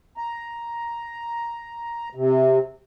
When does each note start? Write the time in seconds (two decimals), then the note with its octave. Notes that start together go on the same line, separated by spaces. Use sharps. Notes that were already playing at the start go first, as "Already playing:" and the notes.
0.17 A#5
2.15 C3